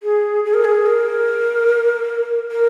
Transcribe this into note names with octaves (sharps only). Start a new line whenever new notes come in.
G#4
G#4
A#4
G#4
A#4
A#4